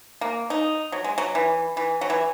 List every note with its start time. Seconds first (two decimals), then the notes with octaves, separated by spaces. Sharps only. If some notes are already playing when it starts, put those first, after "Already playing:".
0.21 A#3
0.50 D#4
0.92 F#3
1.04 G#3
1.18 F#3
1.35 E3
1.77 E3
2.01 F#3
2.10 E3